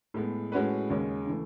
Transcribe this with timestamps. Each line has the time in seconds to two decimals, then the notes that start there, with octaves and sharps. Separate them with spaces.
0.14 A2 G#3 B3
0.52 A2 G#3 C#4 F#4 B4
0.90 D#2 C#3 G#3 C#4
1.27 C#3 E3 A3